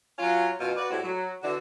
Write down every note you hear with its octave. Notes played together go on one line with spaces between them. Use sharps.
F#3 C#4 F4
F#2 B2 F4
F#4 B4 D5
A2 G3 C4 E4 F#4
F#3
D3 E3 D4 F#4